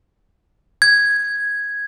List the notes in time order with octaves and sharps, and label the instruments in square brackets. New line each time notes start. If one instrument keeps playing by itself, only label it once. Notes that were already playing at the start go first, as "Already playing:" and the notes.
[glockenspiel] G#6